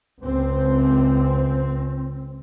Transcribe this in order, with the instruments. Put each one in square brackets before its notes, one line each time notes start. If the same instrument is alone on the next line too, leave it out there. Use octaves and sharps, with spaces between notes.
[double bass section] C#2 C4